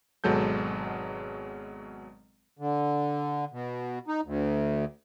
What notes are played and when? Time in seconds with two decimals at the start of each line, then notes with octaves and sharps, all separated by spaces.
0.24 G#1 B2 F#3 G#3 A4 G6
2.59 D3
3.52 B2
4.08 D#4
4.25 D2